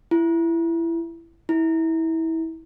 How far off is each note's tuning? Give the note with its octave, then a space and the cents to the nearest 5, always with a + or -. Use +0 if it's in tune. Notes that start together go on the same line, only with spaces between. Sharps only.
E4 +20
E4 -25